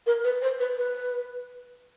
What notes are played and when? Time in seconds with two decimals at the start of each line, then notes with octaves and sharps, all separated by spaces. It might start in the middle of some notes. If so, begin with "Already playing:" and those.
0.06 A#4
0.24 B4
0.41 C5
0.59 B4
0.77 B4